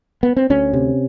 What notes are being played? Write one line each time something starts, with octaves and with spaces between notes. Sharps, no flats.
B3
C4
D2 C#4
C3